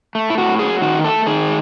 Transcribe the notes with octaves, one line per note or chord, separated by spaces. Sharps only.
A3
E4
A2 F#4
F#3 G#4
D#3 F#4
A3 A4
D#3 G#4